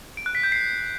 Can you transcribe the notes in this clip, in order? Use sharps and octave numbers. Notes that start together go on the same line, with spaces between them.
D7
F#6
B6
G6
C7